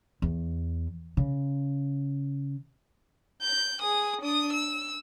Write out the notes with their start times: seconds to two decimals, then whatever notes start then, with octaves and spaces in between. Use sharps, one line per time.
0.22 E2
1.17 C#3
3.42 G6
3.81 G#4 D#6
4.22 D4 D#6
4.53 E6